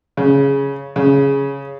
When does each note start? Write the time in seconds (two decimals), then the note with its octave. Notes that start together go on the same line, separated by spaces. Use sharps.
0.17 C#3
0.96 C#3